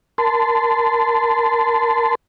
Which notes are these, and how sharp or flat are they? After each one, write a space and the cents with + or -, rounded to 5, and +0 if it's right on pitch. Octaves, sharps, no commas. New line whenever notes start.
A#4 +0 A5 +0 C6 -30